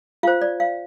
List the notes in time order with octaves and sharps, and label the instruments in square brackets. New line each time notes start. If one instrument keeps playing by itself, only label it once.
[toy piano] F4 C5 F5
D5
F5